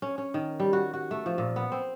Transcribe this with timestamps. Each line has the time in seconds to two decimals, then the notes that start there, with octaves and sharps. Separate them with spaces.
0.02 C#4
0.18 C#4
0.34 D#3
0.60 G3
0.73 F#4
0.93 F#4
1.11 A3
1.26 F3
1.38 A#2
1.56 B3
1.72 C4